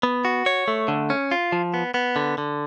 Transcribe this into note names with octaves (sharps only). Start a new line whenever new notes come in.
B3
F#4
C#5
A3
D3
C#4
F4
F3
B3
B3
D3
D3